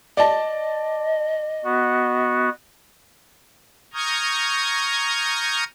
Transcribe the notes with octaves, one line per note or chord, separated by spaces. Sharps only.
D5 D#5 A5
B3 F#4
A#5 C#6 D#6 F6 G6 G#6